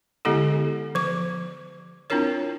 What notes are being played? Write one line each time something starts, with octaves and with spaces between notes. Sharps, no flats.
D3 G#3 B3 E4 G4 A4
F3 D6
C4 D4 E4 F4 A#4 C#5